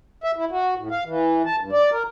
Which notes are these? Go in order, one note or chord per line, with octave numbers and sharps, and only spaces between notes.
E5
E4
F#4
A2
F5
E3
A5
G2
D5
A#4